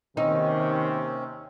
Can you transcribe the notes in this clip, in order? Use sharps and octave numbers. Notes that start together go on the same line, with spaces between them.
D#2 C3 D#3 C4 C#4 D#4